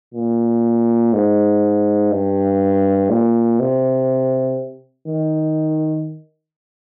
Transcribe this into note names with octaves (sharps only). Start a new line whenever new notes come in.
A#2
G#2
G2
A#2
C3
D#3